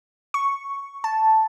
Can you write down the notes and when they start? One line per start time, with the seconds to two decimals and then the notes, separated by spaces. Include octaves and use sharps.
0.34 C#6
1.04 A5